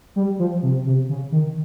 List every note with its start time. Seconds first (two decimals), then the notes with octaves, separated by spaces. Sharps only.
0.16 G3
0.39 F3
0.63 C3
0.86 C3
1.09 C#3
1.32 D#3